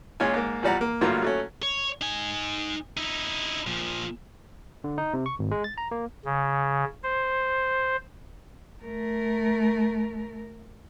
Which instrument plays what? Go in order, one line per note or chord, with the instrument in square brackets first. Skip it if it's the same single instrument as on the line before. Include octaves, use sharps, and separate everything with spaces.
[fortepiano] A#2 G#3 C#4 F4 C#5 G#5
G#2 A#3
E2 F3 G3 D5 F#5 A#5
A#3
G2 D3 F#3 A3 A#3 F4
F#3 A3 C#4
[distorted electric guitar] C#5
D#4 G#5
D#4 E4
A#2 F3
[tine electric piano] D3
D#4
C3
C#6
G#1
G#3
A6
A#5
A#3
[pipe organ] C#3
C5
[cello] A3 A#4